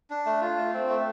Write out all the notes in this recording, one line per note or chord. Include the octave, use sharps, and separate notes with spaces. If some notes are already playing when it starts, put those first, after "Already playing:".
D4
A3
F4
A3
C4
A3